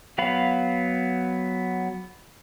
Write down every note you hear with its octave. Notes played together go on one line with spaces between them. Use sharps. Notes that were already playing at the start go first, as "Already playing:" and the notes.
F#3 B3 F5 B5